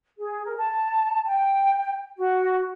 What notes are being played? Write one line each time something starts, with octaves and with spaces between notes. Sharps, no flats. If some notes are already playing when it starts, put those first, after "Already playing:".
G#4
A#4
A5
G5
F#4